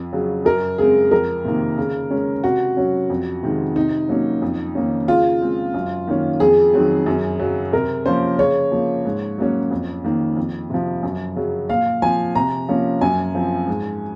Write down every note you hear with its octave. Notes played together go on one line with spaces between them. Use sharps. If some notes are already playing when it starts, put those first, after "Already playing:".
Already playing: F2
C#3 F#3
F#2 A#4
C#3 G#3 C4 G#4
F2 A#4
C3 D#3 A#3
C#3
G#3 C#4
C3 F#4
F#3 C#4
F2
C3 D#3 G#3
C3 D#4
F#3 A#3 C#4
F2
D#3 A#3 C#4
C#3 F4
G#3 C4
F#2
D#3 A#3 C#4
F2 G#4
D#3 F#3 C4
F#2
C#3 F#3
C3 A#4
F3 A#3 C#4 C5
C#3 C#5
F3 A#3
G#2
F#3 A#3 C#4
F2
D#3 A#3
F2
C3 F3
F#2
C#3 F#3
A#2 F5
F3 C4 G#5
C3 A#5
F3 A#3 C#4
F#2 G#5
F3 C4
G#2